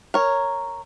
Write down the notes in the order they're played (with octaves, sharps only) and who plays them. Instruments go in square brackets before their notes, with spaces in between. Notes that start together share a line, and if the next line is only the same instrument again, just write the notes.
[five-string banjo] A#4 C#5